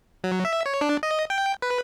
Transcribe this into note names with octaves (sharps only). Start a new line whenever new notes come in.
F#3
E5
C#5
D4
D#5
G5
B4